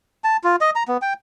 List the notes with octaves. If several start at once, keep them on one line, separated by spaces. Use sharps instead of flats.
A5
F4
D#5
A#5
B3
G5